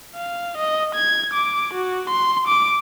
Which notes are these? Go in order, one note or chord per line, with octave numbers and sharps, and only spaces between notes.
F5
D#5
G#6
D6
F#4
C6
D6